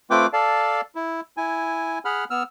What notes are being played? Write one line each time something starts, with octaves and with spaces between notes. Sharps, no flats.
A3 C4 F4 B4 G5 D6
A4 D5 F5 A5
E4
E4 G#5
G#4 F#5 B5 F6
B3 E6 F6